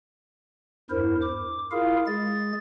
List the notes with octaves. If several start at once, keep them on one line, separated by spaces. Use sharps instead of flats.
E2 G2 E4 A#4 C5
D6
E4 F4 G#4 A#4 F5
G#3 G#4 A6